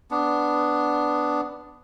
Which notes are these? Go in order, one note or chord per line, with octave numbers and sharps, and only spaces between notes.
B3 D4